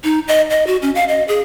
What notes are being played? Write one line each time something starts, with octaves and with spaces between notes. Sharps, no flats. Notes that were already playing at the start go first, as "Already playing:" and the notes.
D#4
D#5
D#5
F#4
C#4
F5
D#5
G#4